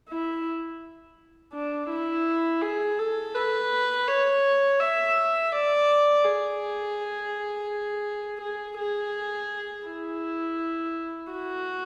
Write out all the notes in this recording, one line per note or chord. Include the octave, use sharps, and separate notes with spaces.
E4
D4
E4
G#4
A4
B4
C#5
E5
D5
G#4
G#4
G#4
E4
F#4